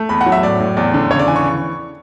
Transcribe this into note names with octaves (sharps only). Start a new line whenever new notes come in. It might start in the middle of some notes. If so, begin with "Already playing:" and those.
Already playing: A3
E2 B5
F#5
F#3
E5
A2 D5
A2
E2 D5
D3
C#3 C#5
D5
E3 G#5
C#6